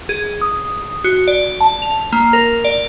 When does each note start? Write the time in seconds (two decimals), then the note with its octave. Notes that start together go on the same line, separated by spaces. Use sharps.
0.09 G#4
0.41 D#6
1.04 F#4
1.28 D5
1.61 A5
1.82 F7
2.13 A#3
2.33 A#4
2.65 D5